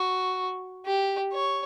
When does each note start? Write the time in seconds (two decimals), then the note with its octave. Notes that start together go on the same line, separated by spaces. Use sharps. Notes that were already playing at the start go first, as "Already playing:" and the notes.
Already playing: F#4
0.86 G4
1.33 C#5